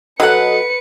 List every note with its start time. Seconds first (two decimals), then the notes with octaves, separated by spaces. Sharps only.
0.20 F#3 A4 B4 D#5 F#5 C#7